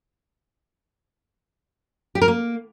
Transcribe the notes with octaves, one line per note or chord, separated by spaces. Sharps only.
G4
A#4
A#3